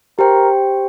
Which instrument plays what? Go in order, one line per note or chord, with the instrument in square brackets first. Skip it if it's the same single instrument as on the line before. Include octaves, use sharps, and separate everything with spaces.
[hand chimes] G4 C5 G5 [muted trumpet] A#4